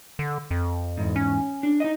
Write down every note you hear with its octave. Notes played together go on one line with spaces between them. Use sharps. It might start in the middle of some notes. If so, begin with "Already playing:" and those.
D3
F2
E2 G#2
C#4
D4
D#4 D#5